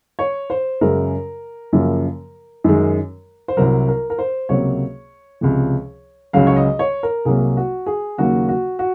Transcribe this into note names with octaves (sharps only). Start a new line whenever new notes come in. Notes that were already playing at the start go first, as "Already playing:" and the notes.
C#5
C5
F#2 C#3 G#3 A#4
F#2 C#3 F3 A#3
F#2 D#3 G#3
C5
C2 C3 F#3 A#4
A#4
A#4
C5
C#2 C3 F#3 A#3 C#5
C#2 C3 F3
C#2 C#3 F#3 F5
C#5
D#5
C#5
A#4
C2 C3 F#3 A#3 G#4
F#4
G#4
D#2 C#3 F#3 A#3 F#4
F#4
F#4